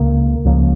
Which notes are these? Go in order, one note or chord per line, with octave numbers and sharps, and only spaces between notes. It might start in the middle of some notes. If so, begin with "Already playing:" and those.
Already playing: C#2 C#3 A#3
C#2 C#3 F3 A#3